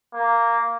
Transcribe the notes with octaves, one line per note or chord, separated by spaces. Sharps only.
A#3